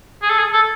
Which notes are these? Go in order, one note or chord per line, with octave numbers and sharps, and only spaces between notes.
G#4
A4
G#4
A4